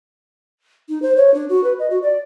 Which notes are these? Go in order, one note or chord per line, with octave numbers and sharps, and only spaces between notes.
D#4
C5
C#5
D4
F#4
B4
D#5
F#4
D5